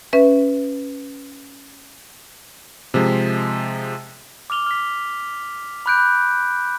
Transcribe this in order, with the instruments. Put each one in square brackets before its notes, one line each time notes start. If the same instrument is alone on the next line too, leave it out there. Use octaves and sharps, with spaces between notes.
[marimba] C#4 B4 E5
[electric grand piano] C3 F3 G#3
[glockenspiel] D6 F6 F7 G7
F6 B6
B5 D6 F#6 G6 D7